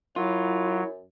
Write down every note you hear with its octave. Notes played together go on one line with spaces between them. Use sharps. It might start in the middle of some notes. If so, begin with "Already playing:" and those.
F#2 F#3 E4 F4